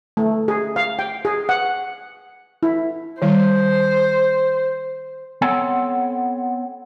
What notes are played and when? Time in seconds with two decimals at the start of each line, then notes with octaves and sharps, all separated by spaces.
0.17 A3
0.48 G#4
0.76 F5
0.99 G5
1.25 G#4
1.49 F#5
2.63 E4
3.22 D#3 G3 C5
5.41 B3 C4 A4 C#5 F#5 G5